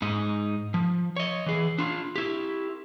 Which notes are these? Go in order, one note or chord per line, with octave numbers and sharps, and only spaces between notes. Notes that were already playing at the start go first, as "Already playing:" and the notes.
G#2 D#4
F3
C#5 D#5
E3 G#4
D4 F4
E4 G4